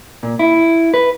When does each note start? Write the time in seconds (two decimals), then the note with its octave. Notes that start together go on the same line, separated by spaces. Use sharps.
0.23 A#2
0.39 E4
0.94 B4